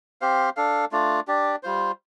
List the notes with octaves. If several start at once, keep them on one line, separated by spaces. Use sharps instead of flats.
C4 G4 C5 F5
D4 A4 F5
A3 D4 F4 D5
D4 G4 D5
G3 F4 C5